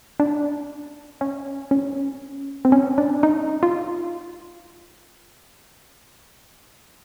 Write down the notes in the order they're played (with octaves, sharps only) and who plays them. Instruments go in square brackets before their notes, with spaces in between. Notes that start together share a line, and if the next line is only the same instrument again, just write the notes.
[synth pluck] D4
C#4
C#4
C4
C#4
D4
D#4
F4